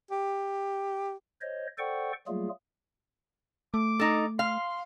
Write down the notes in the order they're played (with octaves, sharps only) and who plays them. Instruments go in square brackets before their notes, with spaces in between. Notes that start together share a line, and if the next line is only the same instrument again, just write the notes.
[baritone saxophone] G4
[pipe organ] C5 C#5 D#5
A4 C5 D5 F#5 G5 C#6
F#3 G3 A3 A#3 F4 G#4
[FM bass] A3 [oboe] D6
[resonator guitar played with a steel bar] D#4 A4
[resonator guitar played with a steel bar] F5 [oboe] C6